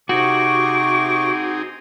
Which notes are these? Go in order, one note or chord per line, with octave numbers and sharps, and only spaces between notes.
C3 C4 D#4 F#4 G#4 C#6 D6